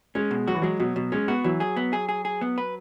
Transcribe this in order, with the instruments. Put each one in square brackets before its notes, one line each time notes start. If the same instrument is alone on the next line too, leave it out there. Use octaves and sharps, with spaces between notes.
[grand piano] G#3 [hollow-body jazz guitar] C#4
[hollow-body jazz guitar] B2
[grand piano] F#3 [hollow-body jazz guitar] F#4
[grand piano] E3
[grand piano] F#3 [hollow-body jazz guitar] G#3
[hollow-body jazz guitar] B2 [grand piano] F#3
[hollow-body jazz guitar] B2 [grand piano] F#3
[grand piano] G#3 [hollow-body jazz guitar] C#4
[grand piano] B3 [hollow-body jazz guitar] F#4
[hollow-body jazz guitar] E3 [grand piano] F#3
[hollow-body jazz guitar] G#4
B3
G#4
G#4
G#4
B3
B4